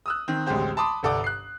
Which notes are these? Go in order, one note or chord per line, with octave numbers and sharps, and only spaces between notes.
D#6 E6 F#6
D#3 C4
A1 D2 G#3 C4 G4 C5
A5 B5 C6 D6 D#6
G1 C2 A4 D5 F#5 D6
F#6 C7